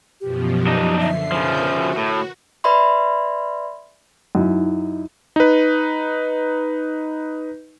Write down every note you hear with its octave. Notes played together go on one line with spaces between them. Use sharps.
F#2 B2 F3 G4
D4 D#4 D#5
D3 E5 C7
C#3 F3 A#4 B4 G6
F#4
A2
B4 D5 E5 B5 C6
F#2 D#4 E4
D#4 B4